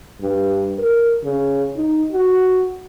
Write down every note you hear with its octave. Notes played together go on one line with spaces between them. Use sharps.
G2
A#4
C#3
D#4
F#4